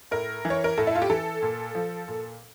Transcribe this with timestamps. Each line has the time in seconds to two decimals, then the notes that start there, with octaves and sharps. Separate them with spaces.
0.11 A2 A#4
0.45 E3
0.50 C#5
0.64 A#4
0.78 A2 A4
0.87 E4
0.95 F4
1.02 G4
1.10 E3 A4
1.42 A#2
1.75 F3
2.08 A#2